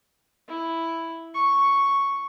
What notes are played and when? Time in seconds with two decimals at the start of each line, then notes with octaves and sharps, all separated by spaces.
0.48 E4
1.34 C#6